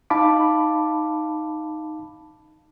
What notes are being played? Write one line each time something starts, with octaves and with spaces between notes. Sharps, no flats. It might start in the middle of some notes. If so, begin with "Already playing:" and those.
D#4 F5 A5 B5 D6